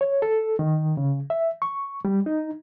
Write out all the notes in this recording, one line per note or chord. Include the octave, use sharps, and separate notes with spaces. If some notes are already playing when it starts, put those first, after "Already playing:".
C#5
A4
D#3
C#3
E5
C#6
G3
D#4